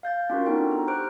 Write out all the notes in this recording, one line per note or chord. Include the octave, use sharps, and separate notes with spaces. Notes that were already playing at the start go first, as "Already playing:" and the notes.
F5 G6 A6
C#4 F4 F#4 A#4
B3 D4 D#4 F#4 A4 G5
A#5
G4 C5 C#6 F6 F#6 D7